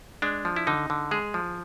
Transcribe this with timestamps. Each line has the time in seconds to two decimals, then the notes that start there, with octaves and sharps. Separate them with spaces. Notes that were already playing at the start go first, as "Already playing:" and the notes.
0.22 G#3 D4
0.45 F3
0.56 E4
0.67 D3 D#4
0.90 D3
1.11 G#3 G#4
1.34 F3